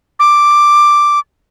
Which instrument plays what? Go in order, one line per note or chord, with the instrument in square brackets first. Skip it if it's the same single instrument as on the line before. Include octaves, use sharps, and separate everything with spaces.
[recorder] D6